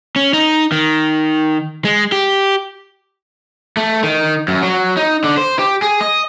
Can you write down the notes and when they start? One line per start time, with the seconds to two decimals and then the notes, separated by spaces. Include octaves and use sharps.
0.16 C#4
0.34 D#4
0.72 D#3
1.85 G#3
2.12 G4
3.77 A3
4.04 D#3
4.48 F#2
4.63 F#3
4.97 D#4
5.24 D3
5.37 C5
5.59 G4
5.82 G#4
6.01 D#5